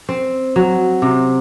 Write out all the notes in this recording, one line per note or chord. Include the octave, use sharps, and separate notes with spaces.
C4
F#3
C3